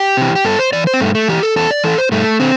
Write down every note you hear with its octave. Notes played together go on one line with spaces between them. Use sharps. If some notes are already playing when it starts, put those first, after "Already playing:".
Already playing: G4
C3 E3
G4
G2 A4
C5
E3 D5
C5
C4
G2 A3
A3
E3 G4
A4
E2 A4
D5
E3 A4
C5
G2 A3
D3 C4